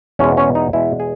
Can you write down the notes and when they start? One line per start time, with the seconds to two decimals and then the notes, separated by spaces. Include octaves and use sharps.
0.19 E2 B2 G#3 C#4
0.37 C#4
0.55 D#4
0.73 E2 B2 G#3 E4
1.00 G#4